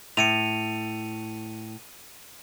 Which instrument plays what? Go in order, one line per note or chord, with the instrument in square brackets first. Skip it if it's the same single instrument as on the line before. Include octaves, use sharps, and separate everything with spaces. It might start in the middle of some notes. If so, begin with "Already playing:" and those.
[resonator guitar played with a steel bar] A2 [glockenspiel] C#7 D#7 F7